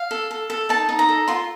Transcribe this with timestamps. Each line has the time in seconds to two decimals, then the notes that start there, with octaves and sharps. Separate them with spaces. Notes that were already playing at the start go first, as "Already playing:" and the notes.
Already playing: F5
0.11 A4
0.31 A4
0.50 A4
0.69 D#4 A5
0.89 D#4
0.99 A#5
1.09 A4
1.28 F4 C6